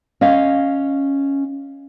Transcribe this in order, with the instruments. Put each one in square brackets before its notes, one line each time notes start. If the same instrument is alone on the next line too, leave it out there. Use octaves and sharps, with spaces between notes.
[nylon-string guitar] C#4 D#5 F5